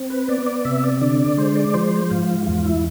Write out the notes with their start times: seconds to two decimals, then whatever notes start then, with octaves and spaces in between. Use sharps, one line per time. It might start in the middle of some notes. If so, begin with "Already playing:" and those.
Already playing: C4
0.10 B4
0.28 B3 D5
0.46 D5
0.65 C3 E5
0.84 D5
1.01 D3 D5
1.20 D5
1.38 G#3 C5
1.56 D5
1.74 F3 C5
2.10 G#2 F4
2.46 E2 F4
2.65 E4